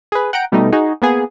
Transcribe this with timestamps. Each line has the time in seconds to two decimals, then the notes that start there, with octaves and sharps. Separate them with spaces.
0.12 G#4 B4
0.33 F#5 G5 A#5 D7
0.52 B2 G3 A3 D#4
0.72 D#4 F#4 G#4
1.02 A#3 B3 G#4